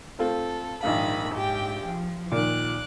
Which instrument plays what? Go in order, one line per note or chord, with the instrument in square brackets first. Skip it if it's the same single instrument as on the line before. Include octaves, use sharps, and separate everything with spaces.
[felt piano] A3 C4 F4 [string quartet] A4
[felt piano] A#1 F5 [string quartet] G#2 D#3 B5
[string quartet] G#2 G4 G5
F3
[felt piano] A#2 D#3 [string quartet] D6 F#6